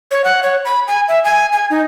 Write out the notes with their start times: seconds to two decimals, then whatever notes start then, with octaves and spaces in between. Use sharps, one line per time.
0.11 C#5
0.24 F#5
0.43 C#5
0.65 B5
0.88 G#5
1.08 E5
1.24 G#5
1.53 G#5
1.70 D#4